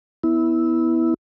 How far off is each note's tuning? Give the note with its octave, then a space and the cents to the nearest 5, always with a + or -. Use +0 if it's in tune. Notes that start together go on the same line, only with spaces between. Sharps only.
B3 +0 E4 -15